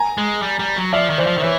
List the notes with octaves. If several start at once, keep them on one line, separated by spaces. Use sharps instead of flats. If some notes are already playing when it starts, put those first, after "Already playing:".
Already playing: G#5 A#5
G#3
G3
G3
F#3
F3 D5 E5
D#3
E3 C5 D5
F3
D#3
E3 B4 C#5